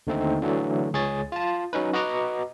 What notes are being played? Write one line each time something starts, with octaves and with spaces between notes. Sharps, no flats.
D#2 D3 A3 C4 D#4
D3 E3 F#3 A3
C#2 G#4 C#5 A6
F4 A5
F#3 C#4 D#4 B4
F#4 B4 D#5 F#5 A#5 D6